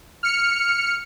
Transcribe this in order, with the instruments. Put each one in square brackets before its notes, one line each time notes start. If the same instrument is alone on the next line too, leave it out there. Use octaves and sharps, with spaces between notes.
[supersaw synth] F6 C#7